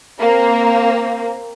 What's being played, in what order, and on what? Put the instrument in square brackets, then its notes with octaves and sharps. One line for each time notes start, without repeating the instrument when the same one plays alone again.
[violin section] A#3 C4